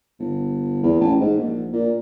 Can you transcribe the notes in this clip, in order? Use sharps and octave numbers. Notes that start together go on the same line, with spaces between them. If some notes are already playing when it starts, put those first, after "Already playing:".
G1
E2
A1
G#2
A#1
A#2